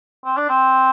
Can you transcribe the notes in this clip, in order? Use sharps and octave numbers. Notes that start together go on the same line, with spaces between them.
C4
D4
C4